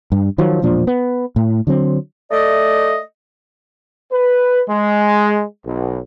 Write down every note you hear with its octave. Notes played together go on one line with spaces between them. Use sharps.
G2
D#3 F3 F#3
E1 A#2 F3 D4
B3
A2
D3 F#3 C4
A3 D5 D#5
B4
G#3
B1